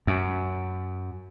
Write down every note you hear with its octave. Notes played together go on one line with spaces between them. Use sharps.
F#2